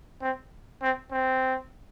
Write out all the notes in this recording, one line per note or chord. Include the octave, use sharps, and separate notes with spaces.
C4
C4
C4